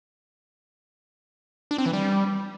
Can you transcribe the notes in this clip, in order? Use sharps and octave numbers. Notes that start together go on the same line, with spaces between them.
D4
C4
E3
G3